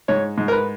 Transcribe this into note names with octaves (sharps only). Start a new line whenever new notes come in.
G#2 C#5
G#2
A#4
B4